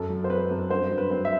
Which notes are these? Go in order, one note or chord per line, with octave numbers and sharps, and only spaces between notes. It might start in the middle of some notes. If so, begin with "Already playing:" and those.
Already playing: F#2 A4
F#3
C5
C4 B4
F#2
G2 C5
F#3
B4
C4
E5